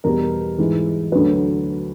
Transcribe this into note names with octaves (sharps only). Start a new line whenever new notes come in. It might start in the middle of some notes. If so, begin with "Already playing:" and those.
E2 B2 G3 A#4
G#2 E3 G#3
D2 D3 F#3 B4